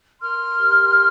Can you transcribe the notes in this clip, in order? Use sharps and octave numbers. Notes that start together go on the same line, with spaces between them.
A#4 C6 F6
G4